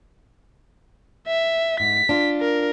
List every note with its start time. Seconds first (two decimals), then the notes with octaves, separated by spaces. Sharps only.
1.27 E5
1.80 G#2 B6
2.09 D4 F4
2.41 A#4